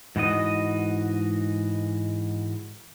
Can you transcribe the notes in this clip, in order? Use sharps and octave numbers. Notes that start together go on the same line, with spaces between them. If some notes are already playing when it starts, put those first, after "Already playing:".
G#2 E3 F#4 D#5